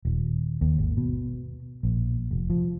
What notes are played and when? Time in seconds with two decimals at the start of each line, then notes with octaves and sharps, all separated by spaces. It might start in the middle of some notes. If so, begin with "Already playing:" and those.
0.05 D#1
0.61 D#2
0.78 G#1
0.97 B2
1.83 A#1
2.31 F1
2.50 F3